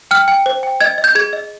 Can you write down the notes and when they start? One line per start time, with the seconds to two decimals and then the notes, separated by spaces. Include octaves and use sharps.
0.11 G5 F6
0.28 G5
0.46 C5
0.63 G5
0.81 D#5 G#6
0.98 D#5
1.04 G6
1.15 G#4 G#6
1.33 D#5